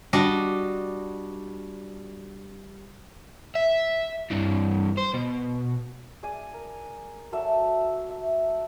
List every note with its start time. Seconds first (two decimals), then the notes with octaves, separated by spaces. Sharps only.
0.13 G3 D4 F#4 D#5
3.55 E5
4.31 G2 E3
4.98 C5
5.14 B2
6.23 G#4 D5 G#5
6.54 A#4
7.32 F#3 A4 D5 E5
8.10 E5